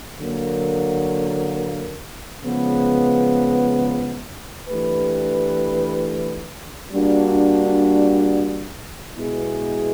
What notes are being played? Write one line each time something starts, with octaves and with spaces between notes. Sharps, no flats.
D3 F#3 A#3
C#3 F3 G#3 B3
E3 A3 D4 G4 B4
G3 A#3 D4 F#4
B2 G#3 B3 E4 G#4